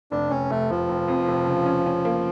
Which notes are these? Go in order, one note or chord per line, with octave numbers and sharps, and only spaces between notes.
F1 D4
F1 C#4
F1 A3
F1 F3
F1
F2
F1
C#3
C#4
C#4
A#3